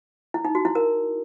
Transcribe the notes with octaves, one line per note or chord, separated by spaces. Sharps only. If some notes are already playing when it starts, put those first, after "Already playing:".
E4
D#4
F#4
E4
A#4